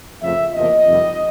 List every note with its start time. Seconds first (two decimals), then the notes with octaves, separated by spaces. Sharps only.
0.22 F2 C#3 F3 A3 E5
0.54 E2 C3 F3 A#3 D#5
0.86 F2 C3 D#3 G3